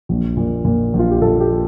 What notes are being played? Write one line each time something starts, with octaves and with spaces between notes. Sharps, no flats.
A#1
A#2
A#2
A#1
F4
G4
A#2 A4
G4